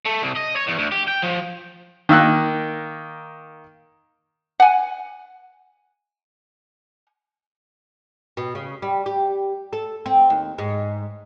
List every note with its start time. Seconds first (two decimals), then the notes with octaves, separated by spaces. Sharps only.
0.05 A3
0.22 C2
0.36 D#5
0.56 C#5
0.67 E2
0.78 D2
0.92 G4
1.08 G5
1.22 F3
2.09 D#3 A#3 E6 F#6
4.60 F#5 G#5
8.37 B2
8.55 C#3
8.82 G3
9.06 G4
9.73 A4
10.06 C4
10.30 D#2
10.58 G#2